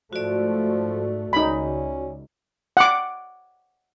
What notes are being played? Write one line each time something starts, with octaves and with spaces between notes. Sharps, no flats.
G#2 F3 A3 F#4 D5
C#2 C#4 D#4 B5
F#5 D6